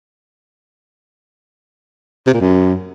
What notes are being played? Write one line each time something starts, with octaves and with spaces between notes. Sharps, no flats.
C3
A#2
F#2